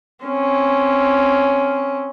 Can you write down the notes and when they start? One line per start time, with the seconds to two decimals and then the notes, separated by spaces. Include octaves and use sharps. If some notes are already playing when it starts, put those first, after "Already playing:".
0.25 C4 C#4